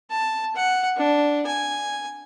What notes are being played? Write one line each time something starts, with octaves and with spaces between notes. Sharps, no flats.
A5
F#5
D4
G#5